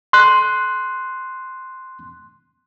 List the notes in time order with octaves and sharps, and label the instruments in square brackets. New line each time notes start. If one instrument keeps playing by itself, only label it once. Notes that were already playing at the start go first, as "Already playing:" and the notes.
[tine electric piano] C6 F#6